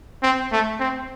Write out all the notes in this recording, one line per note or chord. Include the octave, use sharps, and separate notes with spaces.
C4
A3
C4